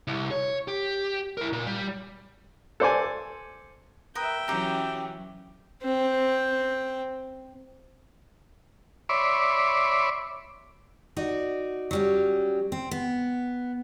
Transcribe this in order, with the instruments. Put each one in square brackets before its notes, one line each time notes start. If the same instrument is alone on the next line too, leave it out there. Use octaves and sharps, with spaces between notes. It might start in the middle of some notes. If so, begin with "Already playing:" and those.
[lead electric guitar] C2
C#5
G4
E4 A#4
A#2
G3
[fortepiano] A4 C5 D5 G#5
[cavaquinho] A#4 B4 D#6 [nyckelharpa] E5 G5
[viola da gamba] E3 F#3 C#4 [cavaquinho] G4 A#5
[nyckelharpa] C4 G5
[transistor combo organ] C#5 D5 E5 B5 C6 D6
[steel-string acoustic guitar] D#4 F#4 D5
F#3 G3 C#4
C4
B3